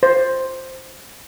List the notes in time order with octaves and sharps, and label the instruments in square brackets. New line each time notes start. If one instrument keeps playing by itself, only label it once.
[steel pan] C5